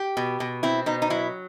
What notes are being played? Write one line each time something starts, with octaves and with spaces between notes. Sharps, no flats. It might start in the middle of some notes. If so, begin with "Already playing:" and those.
Already playing: G4
B2
B2
C4 E4
B2 D#4
D#4
F#3 E4